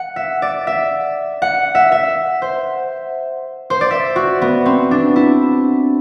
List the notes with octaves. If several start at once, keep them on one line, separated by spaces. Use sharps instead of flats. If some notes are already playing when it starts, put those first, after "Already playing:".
Already playing: F#5
E5
D5
E5
F#5
E5
E5
C5
C5
D5
E5
F#4
B3
C4
D4
E4